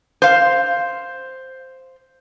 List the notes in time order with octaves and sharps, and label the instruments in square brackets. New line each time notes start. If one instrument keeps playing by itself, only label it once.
[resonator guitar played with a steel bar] C5 F5